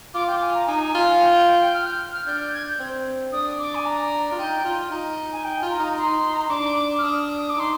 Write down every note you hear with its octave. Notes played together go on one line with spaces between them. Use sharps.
F4 D6
G5
G#5
A#5
D#4 G#5
F4
G5
G5
G5
G5
F6
G6
F6
D4 G6
G6
G#6
G6
C4
D4 D#6
D6
G#5
A#5
F4
D#4 G5
D#4
F4
D#4
G#5
D#4 G5
F4
A#5
D#4
D#4 C6
A#5
D#4 C6
D4 D6
F6
D4 D#6
D#6
D6
D#4 C6